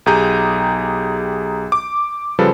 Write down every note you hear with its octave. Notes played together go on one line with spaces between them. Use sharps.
B1 G4 G#4 A#5 G6 D#7
D6
C#3 F3 G3 A4 B4